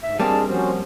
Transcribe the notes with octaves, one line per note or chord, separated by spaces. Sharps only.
D2 G#2 E5
G3 G#3 A#3 C4 D4 G#4 A5
F3 C#4 F#4 C5